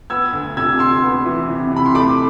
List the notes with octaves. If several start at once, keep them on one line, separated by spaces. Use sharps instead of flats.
B3 E6 G#6
D2
C3 E6 G#6
D2 C6 E6
B3
E3
C3
C3 B5
C6
A3 B5 D6